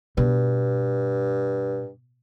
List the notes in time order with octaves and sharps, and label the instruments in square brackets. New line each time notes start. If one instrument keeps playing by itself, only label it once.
[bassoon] G2 [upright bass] B2